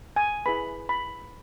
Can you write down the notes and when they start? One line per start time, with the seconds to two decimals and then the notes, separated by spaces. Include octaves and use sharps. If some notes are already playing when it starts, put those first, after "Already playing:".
0.16 G#5
0.46 E4 G#4 B4 B5
0.89 B5